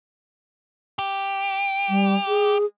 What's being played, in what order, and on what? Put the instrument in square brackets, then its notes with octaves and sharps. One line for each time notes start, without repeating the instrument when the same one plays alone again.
[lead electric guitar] G4
[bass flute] G3
G#4